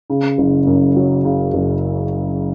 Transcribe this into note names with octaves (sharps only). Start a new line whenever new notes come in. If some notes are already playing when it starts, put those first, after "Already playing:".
C#3
F#1
F#2
F#3
C#3
F#1